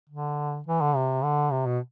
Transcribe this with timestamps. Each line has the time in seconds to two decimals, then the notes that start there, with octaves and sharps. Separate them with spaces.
0.09 D3
0.67 E3
0.81 D3
0.95 C3
1.23 D3
1.52 C3
1.66 B2